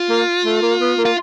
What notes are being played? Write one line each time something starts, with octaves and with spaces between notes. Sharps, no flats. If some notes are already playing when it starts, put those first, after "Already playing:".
Already playing: F4
A#3
A3
A#3
B3
A#3
F4